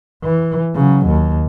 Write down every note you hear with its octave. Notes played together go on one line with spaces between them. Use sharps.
E3
C#3 F#3
D#2